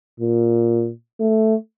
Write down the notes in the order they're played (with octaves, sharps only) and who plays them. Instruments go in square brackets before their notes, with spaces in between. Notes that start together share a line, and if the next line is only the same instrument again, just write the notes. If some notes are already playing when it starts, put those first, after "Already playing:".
[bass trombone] A#2
A3